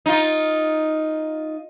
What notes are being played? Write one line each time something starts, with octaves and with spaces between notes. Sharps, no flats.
D#4 F4